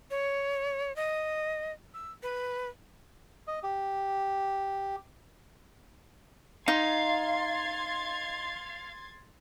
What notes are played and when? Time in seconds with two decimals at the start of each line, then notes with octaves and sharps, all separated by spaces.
0.11 C#5
0.96 D#5
1.94 E6
2.23 B4
3.47 D#5
3.63 G4
6.68 D#4 F5 C6 G#6 A6